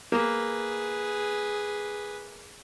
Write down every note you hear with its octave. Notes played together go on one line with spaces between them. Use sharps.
A#3 G#4 B4